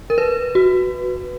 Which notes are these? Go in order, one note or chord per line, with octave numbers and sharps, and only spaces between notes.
A#4
B4
F#4